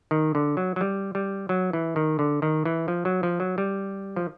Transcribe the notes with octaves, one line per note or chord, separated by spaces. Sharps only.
D#3
D3
F#3
F#3
G3
G3
F#3
E3
D#3
D3
D#3
E3
F3
F#3
F3
F#3
G3
F3